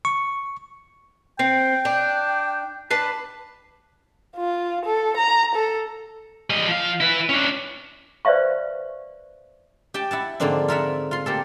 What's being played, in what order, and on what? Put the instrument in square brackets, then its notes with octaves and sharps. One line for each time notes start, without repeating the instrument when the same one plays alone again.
[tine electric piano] C#6
[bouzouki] C4 [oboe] G5
[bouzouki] D4
D4 B4 A5
[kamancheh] F4
A4
A#5
A4
[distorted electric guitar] G3 D#5
F3 F5
E4 B4
C#4 D4
[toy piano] B4 C5 D5 E5 F5 C#6
[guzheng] G4 G5 A5
E4 F#5 A5
G#2 D3 F3 A#3 C4 D4
F4 A#4 E5 F#5
F4 C6
A#3 G4 A4